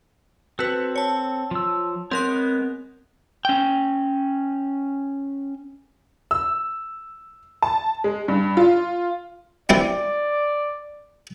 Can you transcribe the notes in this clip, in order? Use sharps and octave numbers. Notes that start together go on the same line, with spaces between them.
C4 F#4 A4 B4
C#5 A5
F3 E6
G#3 B3 C4 A#4 C#5 F#6
C#4 G5
E6
A5
G#3
G2
F4
E3 C4 E4 D5